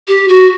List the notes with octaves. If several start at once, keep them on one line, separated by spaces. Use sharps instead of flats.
G4
F#4